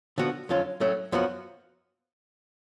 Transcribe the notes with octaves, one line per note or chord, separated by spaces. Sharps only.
D3 F3 B3 F#4
F2 D3 F#3 C#4 F4
A2 F#3 A3 C#4
F#2 F3 B3 F#4